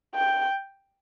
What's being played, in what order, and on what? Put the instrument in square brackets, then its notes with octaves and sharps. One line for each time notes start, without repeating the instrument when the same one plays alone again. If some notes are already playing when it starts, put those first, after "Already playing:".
[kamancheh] G5